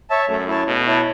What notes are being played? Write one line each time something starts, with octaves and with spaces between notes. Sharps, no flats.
C#5 E5 A5
F#2 A3
E4 C#5 A5
B2 A3
E4 C#5 A5